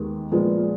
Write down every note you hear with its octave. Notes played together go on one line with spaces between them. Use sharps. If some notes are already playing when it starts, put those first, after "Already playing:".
Already playing: D#2 D#3 G#3 B3
A#2 F3 G#3 B3